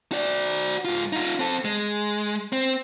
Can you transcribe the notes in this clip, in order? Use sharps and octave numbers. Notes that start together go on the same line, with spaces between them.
F#4 D5
G#2 F4
D#4 F4
C4 A4
G#3
C4